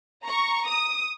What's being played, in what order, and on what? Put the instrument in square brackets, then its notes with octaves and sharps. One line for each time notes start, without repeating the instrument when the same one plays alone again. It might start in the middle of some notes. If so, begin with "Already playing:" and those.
[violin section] A#5 C#6
D#6